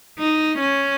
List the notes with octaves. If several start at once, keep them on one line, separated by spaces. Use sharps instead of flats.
D#4
C#4